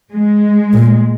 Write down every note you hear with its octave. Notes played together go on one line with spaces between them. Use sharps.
G#3
A#2